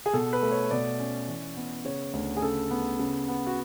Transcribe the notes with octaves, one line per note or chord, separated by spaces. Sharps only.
G#4
B2 A4
B4
A3
C#5
B2 D5
C#4
E3
B3
C#3 C#5
D2
G#4
C#3 A4
B3
C#3
B3
F#4